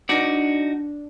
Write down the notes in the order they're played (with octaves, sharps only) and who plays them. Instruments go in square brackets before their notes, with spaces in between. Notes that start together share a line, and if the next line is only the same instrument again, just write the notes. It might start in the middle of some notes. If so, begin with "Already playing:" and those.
[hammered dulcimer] D4 [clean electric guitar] D#4 F#4 D5